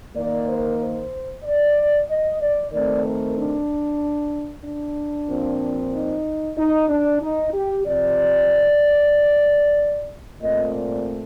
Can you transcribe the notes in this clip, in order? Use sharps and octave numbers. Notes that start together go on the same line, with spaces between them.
D#3 A#3 D5
C5
C5
D5
D#5
D5
D#3 A3 C4 D5
A#4
D4
D4
A#2 F3 C4
D#4
D#4
D4
D#4
G4
C3 F3 C4 D5
A#2 A3 C4 D#5
D5